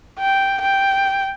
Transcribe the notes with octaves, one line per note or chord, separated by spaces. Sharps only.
G5
G5